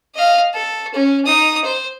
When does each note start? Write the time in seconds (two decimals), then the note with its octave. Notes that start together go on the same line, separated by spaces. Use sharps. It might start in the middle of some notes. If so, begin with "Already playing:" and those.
0.15 D#5 F5
0.54 A4
0.94 C#4
1.26 D#4 D#6
1.65 C5